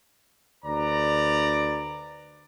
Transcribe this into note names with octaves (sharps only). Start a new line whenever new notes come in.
D2 B4 D5 A#5